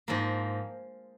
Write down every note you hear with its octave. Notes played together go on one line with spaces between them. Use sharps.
G#2 F3 A#3